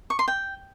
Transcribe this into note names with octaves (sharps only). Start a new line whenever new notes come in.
C#6
C6
G5